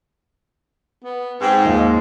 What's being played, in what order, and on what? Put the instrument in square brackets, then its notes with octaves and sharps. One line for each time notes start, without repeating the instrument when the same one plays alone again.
[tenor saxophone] B3
[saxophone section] G#2 [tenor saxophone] C4
[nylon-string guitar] D#2 [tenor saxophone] F3